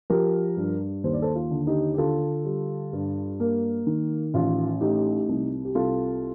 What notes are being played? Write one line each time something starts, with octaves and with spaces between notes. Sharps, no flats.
F3 G4 A#4
G2
D#2 C5
D5
A4 C5
F4
D3
D#4 G4
G4
D3 F4 A4
G3
G2
A#3
D#3
A1 F4
A3 D#4 G4
C2
G4
C2 F4 A4